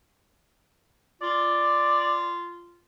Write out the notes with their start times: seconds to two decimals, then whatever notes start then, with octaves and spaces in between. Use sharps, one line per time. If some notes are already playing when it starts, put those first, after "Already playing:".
1.22 F4 D5